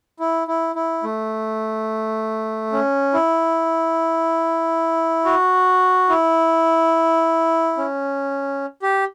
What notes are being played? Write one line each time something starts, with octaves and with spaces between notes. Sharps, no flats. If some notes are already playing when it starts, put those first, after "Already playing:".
E4
E4
E4
A3
C#4
E4
F#4
E4
C#4
G4